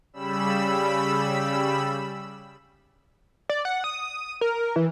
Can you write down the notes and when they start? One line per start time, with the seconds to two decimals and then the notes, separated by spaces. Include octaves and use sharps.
0.13 C#3 G3 B5 E6
3.49 D5
3.65 F#5
3.84 D#6
4.41 A#4
4.76 E3